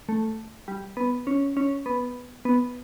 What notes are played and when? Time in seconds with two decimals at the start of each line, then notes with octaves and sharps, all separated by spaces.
0.09 A3
0.68 G3
0.97 B3
1.27 C#4
1.57 C#4
1.86 B3
2.45 B3